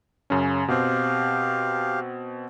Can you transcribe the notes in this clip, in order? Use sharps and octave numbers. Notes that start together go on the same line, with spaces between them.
F#2 C#3 C#4
B2 C4 G4 F5